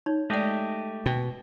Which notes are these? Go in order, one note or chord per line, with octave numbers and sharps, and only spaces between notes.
D#4 C#5
G#3 A3 G4 D5 D#5
B2 G5